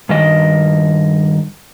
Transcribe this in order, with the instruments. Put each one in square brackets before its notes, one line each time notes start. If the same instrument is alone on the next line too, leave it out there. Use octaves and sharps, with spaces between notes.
[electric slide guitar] G2 D#3 D#5